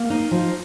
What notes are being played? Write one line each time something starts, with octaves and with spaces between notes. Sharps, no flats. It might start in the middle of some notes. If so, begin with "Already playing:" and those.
Already playing: A#3
D#4
F3